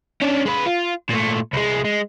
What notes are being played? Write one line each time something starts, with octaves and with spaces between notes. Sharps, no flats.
C#4 D4
G#3 B4
F4
A#2 A3
C2 G#3
G#3